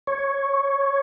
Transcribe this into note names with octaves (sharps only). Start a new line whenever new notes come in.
C#5